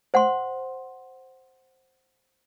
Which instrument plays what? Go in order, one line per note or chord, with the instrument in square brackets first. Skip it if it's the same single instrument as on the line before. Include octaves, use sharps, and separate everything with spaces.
[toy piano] C5 F#5 C6